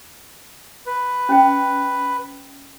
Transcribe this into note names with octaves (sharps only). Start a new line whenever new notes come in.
B4
C#4 G5